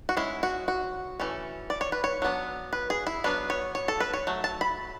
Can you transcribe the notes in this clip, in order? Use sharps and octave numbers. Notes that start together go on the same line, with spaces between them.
F#4
G#3 C#4 E4
F#4
F#4
E3 A3 C#4
D5
C#5
B4
C#5
F#3 B3 D4
B4
G#4
E4
F#3 B3 D4 B4
C#5
C#5
A4
B4
C#5
F#3 A3
A5
B5